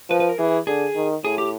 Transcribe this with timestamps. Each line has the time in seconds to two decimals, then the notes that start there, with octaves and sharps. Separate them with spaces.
0.10 F3 B4
0.20 B4
0.29 A#4
0.38 E3 G#4
0.67 D3 G#4
0.96 D#3
1.24 A2 G#4
1.38 G4